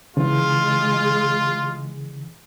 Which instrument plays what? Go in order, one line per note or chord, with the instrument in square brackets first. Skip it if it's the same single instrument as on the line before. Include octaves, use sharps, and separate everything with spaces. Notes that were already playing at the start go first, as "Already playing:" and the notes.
[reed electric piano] C#3 E3 [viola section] G#3 [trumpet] F4